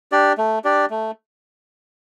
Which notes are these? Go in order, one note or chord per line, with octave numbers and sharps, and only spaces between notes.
D4 G4 D5
A3
D4 G4 D5
A3